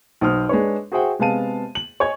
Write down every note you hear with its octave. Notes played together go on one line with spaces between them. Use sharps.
B1 C5 D#6 F6
G#3 D4 B4 C#5
F#4 G#4 C5 E5 F#5 G5
C3 G#3 B3 F5 A5 D#7
F#7
C#5 D#5 G#5 C#6 G#6